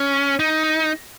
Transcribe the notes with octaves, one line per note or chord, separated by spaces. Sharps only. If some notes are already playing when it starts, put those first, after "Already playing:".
Already playing: C#4
D#4